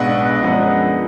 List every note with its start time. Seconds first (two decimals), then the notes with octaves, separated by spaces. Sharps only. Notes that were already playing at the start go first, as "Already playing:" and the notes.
Already playing: B1 B2 G#3 B3 D4 D#5 F#5
0.42 F#2 F3 G#3 B3 D4